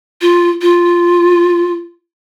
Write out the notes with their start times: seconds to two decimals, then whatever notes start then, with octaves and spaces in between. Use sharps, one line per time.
0.22 F4
0.62 F4